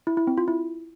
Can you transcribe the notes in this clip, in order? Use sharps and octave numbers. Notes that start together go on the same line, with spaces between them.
E4
E4
C4
F4
E4